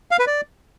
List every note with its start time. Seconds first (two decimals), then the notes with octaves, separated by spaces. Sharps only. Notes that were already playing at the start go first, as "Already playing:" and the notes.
0.11 F5
0.19 B4
0.27 D5